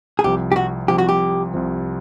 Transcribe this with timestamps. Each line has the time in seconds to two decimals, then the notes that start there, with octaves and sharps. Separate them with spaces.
0.19 G#4
0.24 C2 C3 F3 G4
0.52 G4
0.56 F#4
0.88 C2 C3 F3 G4
0.98 F#4
1.09 G4
1.54 C2 C3 F3